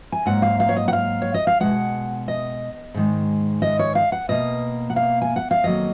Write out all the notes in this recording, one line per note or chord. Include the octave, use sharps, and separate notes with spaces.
G#5
G#2 F#3 A#3 F#5
F5
F5
C#5
D#5
F#5
F5
C#5
D#5
F5
B2 G#3 F#5
D#5
G#2 D#3 G#3
D#5
C#5
F5
F#5
B2 A#3 D#5
F#5
F5
G#5
F#5
F5
F2 D#3 F#3 A#3 D#5